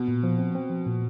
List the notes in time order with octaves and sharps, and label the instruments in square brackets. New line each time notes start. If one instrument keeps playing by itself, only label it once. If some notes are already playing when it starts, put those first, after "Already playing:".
Already playing: [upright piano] B2
[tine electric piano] A#2
F3
C4
C4
F3
A#2